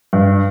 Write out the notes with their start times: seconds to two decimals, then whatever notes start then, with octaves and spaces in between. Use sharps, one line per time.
0.13 G2